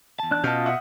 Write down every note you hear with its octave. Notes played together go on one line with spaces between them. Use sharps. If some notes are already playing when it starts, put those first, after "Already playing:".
E2 A5
D4 F#6
B2 C#4 F4 D#5 A5 F6 G6
E5 F#5 D#6